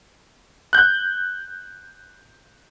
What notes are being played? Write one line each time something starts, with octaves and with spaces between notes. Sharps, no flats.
F#6 G6